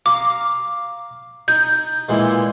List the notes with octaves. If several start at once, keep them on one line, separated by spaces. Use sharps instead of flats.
F5 A#5 D6
D#4 G6
A#2 E3 G#3